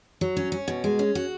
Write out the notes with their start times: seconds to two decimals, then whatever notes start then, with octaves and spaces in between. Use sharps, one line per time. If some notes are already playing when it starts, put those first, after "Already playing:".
0.21 F#3
0.37 C#4
0.52 C#4
0.68 B2
0.84 G#3
0.99 C#4
1.15 F#4